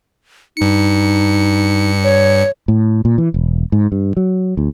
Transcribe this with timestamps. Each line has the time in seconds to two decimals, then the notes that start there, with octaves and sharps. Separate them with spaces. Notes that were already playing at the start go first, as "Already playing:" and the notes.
0.57 G2 D#4 C#7
2.04 C#5
2.68 A2
3.05 A#2
3.18 E3
3.34 E1
3.72 G#2
3.92 G2
4.17 F#3
4.57 D2